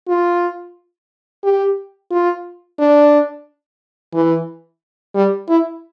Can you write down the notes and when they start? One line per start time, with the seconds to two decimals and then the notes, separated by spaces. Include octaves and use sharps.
0.08 F4
1.44 G4
2.11 F4
2.79 D4
4.14 E3
5.15 G3
5.49 E4